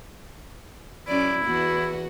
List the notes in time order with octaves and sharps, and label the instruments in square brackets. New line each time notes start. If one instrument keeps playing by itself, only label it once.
[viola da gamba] F#2 C#4 D5 [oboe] E4
[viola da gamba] E2 B3 F#4